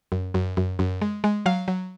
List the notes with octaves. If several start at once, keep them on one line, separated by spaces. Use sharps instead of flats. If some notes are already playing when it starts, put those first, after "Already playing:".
F#2
F#2
F#2
F#2
G#3
G#3
F#3 F5
F#3